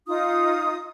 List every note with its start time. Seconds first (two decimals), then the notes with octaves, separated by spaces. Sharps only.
0.08 D#4 F4 D#6